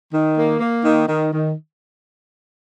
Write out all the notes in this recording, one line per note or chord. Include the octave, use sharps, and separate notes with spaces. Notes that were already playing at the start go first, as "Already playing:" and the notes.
D#3
A#3
A#3
D#3
D#3
D#3